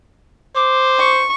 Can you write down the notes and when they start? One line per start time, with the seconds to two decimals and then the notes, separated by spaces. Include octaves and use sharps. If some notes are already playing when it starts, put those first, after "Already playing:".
0.55 C5 D6
0.99 C#6